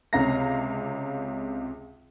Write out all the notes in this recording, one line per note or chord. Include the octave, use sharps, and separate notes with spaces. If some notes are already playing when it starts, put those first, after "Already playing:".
C#2 C3 C#4 F5 A#5 A#6